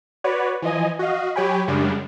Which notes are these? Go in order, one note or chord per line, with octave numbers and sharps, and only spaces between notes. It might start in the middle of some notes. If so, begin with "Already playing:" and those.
F#4 B4 C#5 D5
E3 F3 D#5 G#5
F#4 D#5 F5
F#3 G4 C#5 G5 G#5 B5
F#2 C#3 G3 G#3 D4